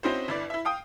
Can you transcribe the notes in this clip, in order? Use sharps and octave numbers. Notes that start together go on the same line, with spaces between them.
C4 C#4 D#4 E4 F#4 C5
G1 E4 D5
E4 E5
F5 G5 D#6